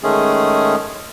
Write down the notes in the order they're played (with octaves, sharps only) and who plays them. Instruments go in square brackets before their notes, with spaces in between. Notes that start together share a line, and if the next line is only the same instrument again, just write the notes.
[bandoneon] D#3 G#3 A3 C#4 G#4